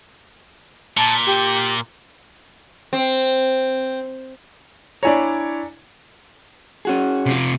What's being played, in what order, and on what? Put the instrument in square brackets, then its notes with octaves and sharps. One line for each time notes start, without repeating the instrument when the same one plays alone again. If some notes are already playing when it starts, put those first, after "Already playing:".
[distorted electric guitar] A#2 [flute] A5
[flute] G4
[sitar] C4
[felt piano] D4 E4 C#5 [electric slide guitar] D5 G#5 A#5
[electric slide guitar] C#4 F#4 G#4
[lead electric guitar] C3 F4